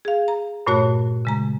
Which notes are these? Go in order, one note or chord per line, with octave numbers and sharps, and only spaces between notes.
G#4 F5
A#5
G2 A#2 A3 F#4 C#5 F#6
C#3 G#3 A#5